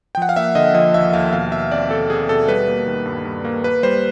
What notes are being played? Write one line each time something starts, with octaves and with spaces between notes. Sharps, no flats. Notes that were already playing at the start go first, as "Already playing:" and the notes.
G5
F3 F#5
F5
A#3 E5
D3 D#5
F3 D#5
D#2 E5
D#2 F5
B2 F5
B2 E5
C4 D5
B2 A4
C4 G#4
B2 A4
G3 B4
A#3
D#3
G2
G2
A#3
A#3 B4
G3 C5